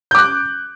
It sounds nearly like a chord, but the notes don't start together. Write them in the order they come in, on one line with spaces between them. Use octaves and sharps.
G6 D6 F#6